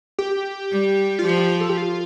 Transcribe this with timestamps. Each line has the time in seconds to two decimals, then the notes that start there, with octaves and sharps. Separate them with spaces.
0.19 G4
0.71 G3
1.19 F4
1.25 F3 G4
1.60 A4
1.69 G4
1.78 F4